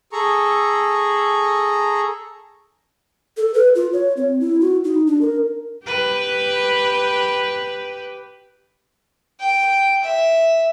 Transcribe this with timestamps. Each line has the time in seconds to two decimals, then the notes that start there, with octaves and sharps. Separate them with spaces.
0.12 G#4 A4 A#5 C#6
3.37 A4
3.54 B4
3.75 F4
3.93 C#5
4.17 C4
4.40 E4
4.61 F#4
4.84 D#4
5.07 D4
5.21 A#4
5.85 G4 B4
9.40 G5
10.03 E5